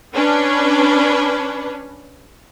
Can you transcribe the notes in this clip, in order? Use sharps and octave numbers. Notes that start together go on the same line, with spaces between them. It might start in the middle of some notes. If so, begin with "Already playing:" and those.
C#4 D4 B4